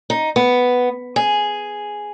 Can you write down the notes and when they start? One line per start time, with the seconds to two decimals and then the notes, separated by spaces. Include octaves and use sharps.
0.10 D#4
0.36 B3
1.16 G#4